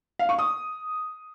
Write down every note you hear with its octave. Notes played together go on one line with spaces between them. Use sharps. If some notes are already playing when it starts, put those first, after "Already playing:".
F5
C#6
D#6